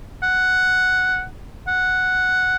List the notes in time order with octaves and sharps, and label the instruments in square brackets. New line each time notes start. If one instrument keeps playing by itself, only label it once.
[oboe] F#5
F#5